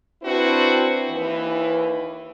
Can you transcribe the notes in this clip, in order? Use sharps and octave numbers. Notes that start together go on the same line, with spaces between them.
C4 D4 E4 F#4 B4 C5
D#2 E3 B4